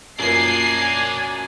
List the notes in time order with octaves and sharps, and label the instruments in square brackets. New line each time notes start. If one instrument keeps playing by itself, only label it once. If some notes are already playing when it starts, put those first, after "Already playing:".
[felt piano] F#2 F3 A#3 [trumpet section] D4 G#5 [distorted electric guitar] A#4 D5 [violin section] C7